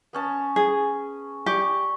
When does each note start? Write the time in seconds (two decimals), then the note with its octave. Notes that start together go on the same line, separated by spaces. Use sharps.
0.13 B3 C#4 A5
0.56 G#4
1.46 G4 D5 C#6